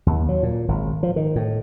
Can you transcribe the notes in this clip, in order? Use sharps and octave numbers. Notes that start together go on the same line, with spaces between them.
D#2
F#3
A#2
G#1
F3
D#3
A2